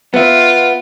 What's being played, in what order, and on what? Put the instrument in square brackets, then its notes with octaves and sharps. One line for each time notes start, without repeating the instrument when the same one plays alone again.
[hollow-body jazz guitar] B3 E5 [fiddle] F4